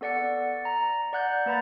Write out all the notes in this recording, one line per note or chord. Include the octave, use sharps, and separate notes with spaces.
B3 A4 D5 F#5 C#7
A#5
D5 F#5 F#6 G6
A#3 B4 A#5 B5 A6